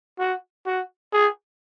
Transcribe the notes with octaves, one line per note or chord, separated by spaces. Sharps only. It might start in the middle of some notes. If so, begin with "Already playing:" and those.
F#4
F#4
G#4